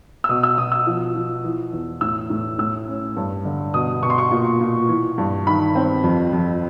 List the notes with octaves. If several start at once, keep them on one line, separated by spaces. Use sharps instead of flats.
E6
B2 D#6
E6
B2 D#6
E6
F3
F3
E3
E2
A2 E6
A2
A2 E6
C#4
G2
D3
B2 D#6
B2 C#6
C6
C#6
A#2
A#2
E3
G2
D#3 B5
C4
F2
F2